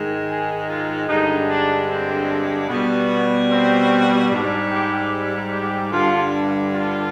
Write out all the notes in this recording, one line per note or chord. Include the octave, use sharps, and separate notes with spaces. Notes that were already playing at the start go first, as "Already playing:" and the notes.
Already playing: G#2 D#3 G#3
G#4
F4
G2 D3 G#3 D#4
D4
C4
B2 G3 B3
C4
G#2 G3 D4
G4
G4
G2 D3 G3 F4
F4